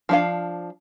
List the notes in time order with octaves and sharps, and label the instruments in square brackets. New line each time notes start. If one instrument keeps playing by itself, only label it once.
[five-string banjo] F3 D4 F5